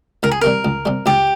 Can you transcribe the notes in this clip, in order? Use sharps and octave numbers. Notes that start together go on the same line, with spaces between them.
C#2 A#4
G#4
C3 G3 A#4
C#2
C3 G3
C#2 G4